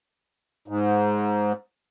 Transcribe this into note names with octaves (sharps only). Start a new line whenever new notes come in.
G#2